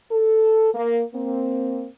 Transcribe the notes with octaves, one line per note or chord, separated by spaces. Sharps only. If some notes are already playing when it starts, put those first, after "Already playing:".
A4
A#3
A#3 C4